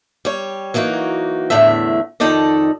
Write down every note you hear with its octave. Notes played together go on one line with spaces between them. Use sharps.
G3 C#5
E3 F#3 A#3 D#4 F#4
E2 A2 D3 A3 E5
F2 D#3 D#4 A4 D5 D#5